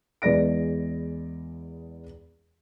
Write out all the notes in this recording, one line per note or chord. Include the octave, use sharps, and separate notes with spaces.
E2 E3 G#3 D5 A#6 D7